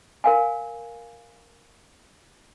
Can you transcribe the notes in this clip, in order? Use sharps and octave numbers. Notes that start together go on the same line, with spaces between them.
A#4 F5 G#5